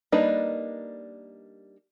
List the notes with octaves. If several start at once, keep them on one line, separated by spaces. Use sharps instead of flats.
G3 A#3 D4 D#4 B4